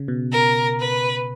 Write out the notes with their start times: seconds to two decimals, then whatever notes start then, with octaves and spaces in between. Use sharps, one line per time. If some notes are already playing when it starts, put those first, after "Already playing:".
Already playing: C#3
0.08 B2
0.32 A#4
0.80 B4